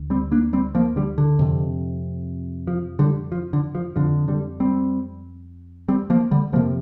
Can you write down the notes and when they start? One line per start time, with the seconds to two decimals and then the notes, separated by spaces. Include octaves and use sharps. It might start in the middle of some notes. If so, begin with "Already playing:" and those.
Already playing: D2
0.10 G3 C4
0.32 A#3 D4
0.53 G3 C4
0.75 F3 A#3
0.96 D3 G3
1.18 D3
1.39 F2 C3
2.67 F3
2.99 D3 G3
3.32 F3
3.53 D3
3.75 F3
3.96 F2 D3 F3
4.28 D3 G3
4.60 G3 C4
5.88 G3 C4
6.10 F3 A#3
6.31 D3 G3
6.52 F2 C3 F3 A#3